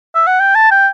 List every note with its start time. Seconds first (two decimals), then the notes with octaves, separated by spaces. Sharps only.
0.15 E5
0.27 F#5
0.40 G5
0.55 A5
0.71 G5